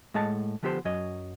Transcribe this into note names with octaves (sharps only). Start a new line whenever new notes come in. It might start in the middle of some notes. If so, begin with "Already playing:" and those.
A2 G#3 D#5 F#5 A5
D3 F3 B3 G4 A4 C5
F#2 F#3 C#5 D#5